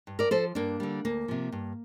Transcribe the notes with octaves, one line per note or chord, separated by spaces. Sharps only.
G2
A#4 D5
F3 A4 C5
G2 A#3 D4
D3 G3
D2 A#3
C3 F3
G2